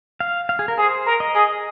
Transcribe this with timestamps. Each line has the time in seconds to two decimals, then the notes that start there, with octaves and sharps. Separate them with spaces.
0.20 F5
0.49 F5
0.59 G#4
0.68 A#4
0.78 G#4 C5
1.06 A#4
1.20 D#5
1.35 G#4